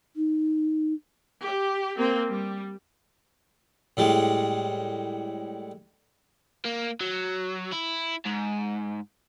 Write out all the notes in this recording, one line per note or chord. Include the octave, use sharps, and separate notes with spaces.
D#4
G4
A#3 C4
G3
A2 G3 G#3
A#3
F#3
E4
G#2